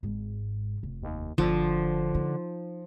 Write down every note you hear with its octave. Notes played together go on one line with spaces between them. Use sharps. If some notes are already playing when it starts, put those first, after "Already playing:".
G#1 G#2
F1
D#2
G1 D3 F3
D#4